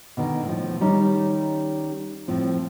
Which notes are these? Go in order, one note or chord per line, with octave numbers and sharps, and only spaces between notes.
B2 D3 D#3
A2 F3
D#3 G3 C#4 D#4
A2 F3 C4